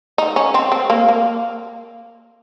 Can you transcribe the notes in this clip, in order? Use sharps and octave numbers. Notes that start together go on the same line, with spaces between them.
D#4
C#4
C4
C4
A#3
A#3